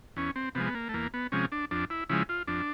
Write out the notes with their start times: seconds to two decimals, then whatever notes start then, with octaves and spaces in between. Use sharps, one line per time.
0.16 E2 C#4
0.36 C4
0.55 C3 F3 G#3 B3
0.66 B3
0.75 A#3
0.89 A3
0.94 E2 A#3
1.14 B3
1.32 C3 F3 G#3 C#4
1.52 D4
1.71 F2 D4
1.90 E4
2.09 C#3 F3 G#3 E4
2.29 F4
2.47 F2 D4